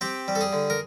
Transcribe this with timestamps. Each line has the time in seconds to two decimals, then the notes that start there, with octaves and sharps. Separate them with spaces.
0.01 C4 G4
0.28 G3
0.35 A4
0.41 G#4
0.53 D3
0.70 A#4